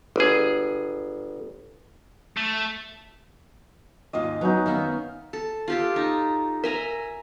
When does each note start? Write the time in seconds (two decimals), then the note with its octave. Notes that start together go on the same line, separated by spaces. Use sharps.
0.16 G1 G#4
2.37 A3
4.13 D#2 G#2 F4 D#5
4.41 F#3 B3 C#4 D#4
4.66 D#3 B3 E5 F5
5.33 A4
5.68 F4 G4 A4
5.96 D#4
6.64 A#4 E5 G#5 A#5